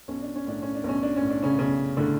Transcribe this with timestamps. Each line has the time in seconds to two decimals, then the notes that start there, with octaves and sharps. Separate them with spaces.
0.08 B1 C#4
0.22 D4
0.36 C#4
0.46 A2 D4
0.62 C#4
0.75 D4
0.84 B1 C#4
1.03 D4
1.16 C#4
1.22 A2
1.29 D4
1.43 C#3 C#4
1.59 B1 C#3 C#4
1.97 A2 D3 D4